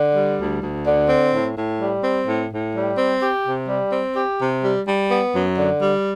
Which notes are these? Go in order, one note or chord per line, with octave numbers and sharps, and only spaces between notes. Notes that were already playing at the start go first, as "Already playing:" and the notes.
Already playing: D3
G3
D2
D2
D3
C4
A2
A2
G3
C4
A2
A2
G3
C4
G4
C3
G3
C4
G4
C3
G3
G3
B3
F#2
D3
G3